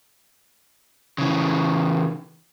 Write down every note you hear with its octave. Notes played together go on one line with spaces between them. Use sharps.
C#3 E3